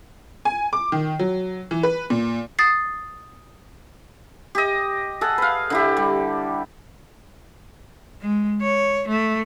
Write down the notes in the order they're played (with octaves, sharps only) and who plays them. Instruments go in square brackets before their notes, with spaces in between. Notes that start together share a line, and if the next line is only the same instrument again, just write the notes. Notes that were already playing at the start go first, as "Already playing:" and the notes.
[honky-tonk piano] G#5
D6
D#3
F#3
E3
B4
A#2
[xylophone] D#6 A6 C7
[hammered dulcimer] G4 D#5
G#4 A4 F#5
B4 F5
D3 E4 G4
G3
[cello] G#3
C#5
A3